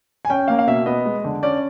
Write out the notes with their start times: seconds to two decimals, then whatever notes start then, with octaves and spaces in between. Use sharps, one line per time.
0.25 G#5
0.30 C#4 G5
0.48 A#3 F5
0.59 F5
0.67 B2 E5
0.86 B3 D#5
1.05 G#3
1.24 D3
1.43 C#4 D5